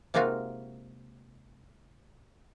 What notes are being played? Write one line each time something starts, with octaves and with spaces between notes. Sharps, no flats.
C3 G#3 A#3 D#4 F4 F#4